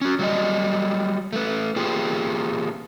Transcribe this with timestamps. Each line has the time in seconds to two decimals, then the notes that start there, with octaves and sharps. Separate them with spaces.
0.01 C#4 F#4
0.19 F#3 G3 D5 D#5
1.33 A3 B4
1.76 A#3 F4 G4 G#4 B4